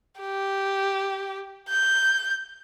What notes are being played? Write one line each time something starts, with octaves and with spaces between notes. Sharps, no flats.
G4
G6